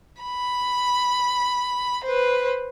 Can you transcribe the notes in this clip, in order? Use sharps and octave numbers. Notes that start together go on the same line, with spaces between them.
B5
B4 C5